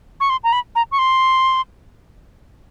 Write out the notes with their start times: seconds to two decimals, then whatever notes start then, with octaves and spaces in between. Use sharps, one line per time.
0.20 C#6
0.30 C6
0.44 A#5
0.52 B5
0.75 A#5
0.92 C#6
0.99 C6